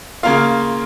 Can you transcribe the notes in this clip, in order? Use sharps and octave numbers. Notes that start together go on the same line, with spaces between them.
C#3 A#3 F4 F5